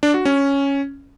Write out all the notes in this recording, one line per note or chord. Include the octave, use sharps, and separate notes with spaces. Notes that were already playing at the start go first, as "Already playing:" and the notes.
D4
F#4
C#4